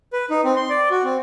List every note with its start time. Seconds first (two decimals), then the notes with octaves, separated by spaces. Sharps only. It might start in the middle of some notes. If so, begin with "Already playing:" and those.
0.13 B4
0.30 D#4
0.44 C4
0.56 C6
0.70 D5
0.91 F#4
1.04 C4